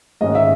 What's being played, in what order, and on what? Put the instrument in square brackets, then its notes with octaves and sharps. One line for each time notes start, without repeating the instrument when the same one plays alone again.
[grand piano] G#2 D#3 G#3 C#4 [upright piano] D#5
[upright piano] E5